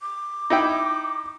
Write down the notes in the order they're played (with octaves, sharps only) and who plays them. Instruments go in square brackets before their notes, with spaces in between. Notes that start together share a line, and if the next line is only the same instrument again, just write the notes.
[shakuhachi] D6
[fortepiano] D#4 E4 G5